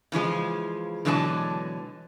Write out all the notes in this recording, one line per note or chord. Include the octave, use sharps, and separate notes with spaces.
C#3 E3 F3 G#3
B2 D3 E3 F#3 G#3 A5